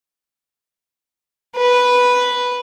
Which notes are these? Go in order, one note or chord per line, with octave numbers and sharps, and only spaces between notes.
B4